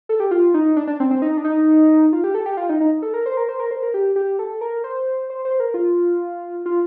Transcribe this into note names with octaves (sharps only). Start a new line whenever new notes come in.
A4
G4
F4
D#4
D4
D4
C4
C4
D#4
D4
D#4
F4
G4
A4
G4
F4
D#4
D#4
A4
A#4
C5
A#4
C5
A#4
C5
A#4
G4
G4
A4
A#4
C5
C5
C5
A#4
F4
F4